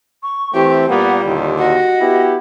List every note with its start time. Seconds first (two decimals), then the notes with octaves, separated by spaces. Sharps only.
0.23 C#6
0.54 E3 A3 C4 G4
0.88 A#2 G3 A#3 B3 F#5
1.24 D#2 A#2 D3 E4
1.58 F#4 D#5
2.01 B3 E4 G4